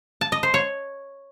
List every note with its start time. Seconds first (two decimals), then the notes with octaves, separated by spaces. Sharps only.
0.21 A5
0.32 D#5
0.43 C5
0.54 C#5